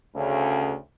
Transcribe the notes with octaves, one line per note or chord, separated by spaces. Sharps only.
D2 C#3